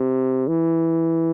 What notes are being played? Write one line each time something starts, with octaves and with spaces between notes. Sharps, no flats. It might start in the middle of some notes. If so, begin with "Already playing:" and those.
Already playing: C3
E3